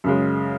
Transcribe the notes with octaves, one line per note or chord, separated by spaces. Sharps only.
F#2 C#3 G#3